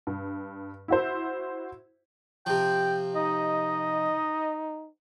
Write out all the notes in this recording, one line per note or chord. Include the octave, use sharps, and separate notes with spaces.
G2
E4 F#4 C5
C3 F3 G5
D#4 D#5